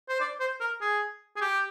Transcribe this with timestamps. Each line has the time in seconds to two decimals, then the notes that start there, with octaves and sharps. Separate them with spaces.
0.09 C5
0.20 D5
0.40 C5
0.60 A#4
0.81 G#4
1.36 G#4
1.41 G4